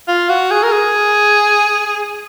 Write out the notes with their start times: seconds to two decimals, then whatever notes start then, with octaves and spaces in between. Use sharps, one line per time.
0.08 F4
0.29 F#4
0.51 G#4
0.63 A#4
0.72 G#4